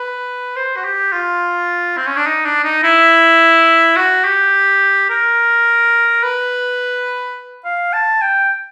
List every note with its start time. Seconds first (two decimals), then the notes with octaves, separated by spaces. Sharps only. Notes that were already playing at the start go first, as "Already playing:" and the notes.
Already playing: B4
0.56 C5
0.76 F#4
0.84 G4
1.12 F4
1.97 C4
2.07 C#4
2.17 D4
2.26 D#4
2.45 D4
2.64 D#4
2.83 E4
3.96 F#4
4.25 G4
5.09 A#4
6.23 B4
7.65 F5
7.93 A5
8.22 G5